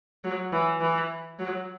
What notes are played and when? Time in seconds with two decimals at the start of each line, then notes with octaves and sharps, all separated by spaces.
0.24 F#3
0.52 E3
0.81 E3
1.39 F#3